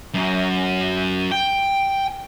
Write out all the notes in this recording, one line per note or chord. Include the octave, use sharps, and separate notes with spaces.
F#2 F#3
G5